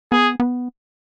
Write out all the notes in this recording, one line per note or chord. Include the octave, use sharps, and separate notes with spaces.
B3 G#4
B3